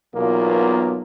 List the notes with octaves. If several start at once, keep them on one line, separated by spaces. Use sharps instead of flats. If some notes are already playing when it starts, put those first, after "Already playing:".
B1 E2 B2 A#3 F4 A#4